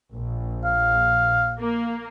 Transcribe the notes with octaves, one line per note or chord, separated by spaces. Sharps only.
A#1
F5
A#3